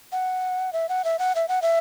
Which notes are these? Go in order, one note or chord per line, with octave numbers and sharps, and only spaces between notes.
F#5
E5
F#5
E5
F#5
E5
F#5
E5